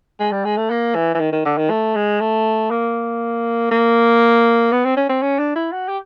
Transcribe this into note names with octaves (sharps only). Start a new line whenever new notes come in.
G#3
G3
G#3
A3
A#3
E3
E3
D#3
D#3
D3
D#3
A3
G#3
A3
A#3
A#3
B3
C4
C#4
C4
C#4
D4
E4
F#4
G4